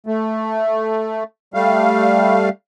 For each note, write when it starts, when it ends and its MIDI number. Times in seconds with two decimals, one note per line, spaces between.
0.07 1.24 57
1.54 2.49 55
1.54 2.49 57
1.54 2.49 77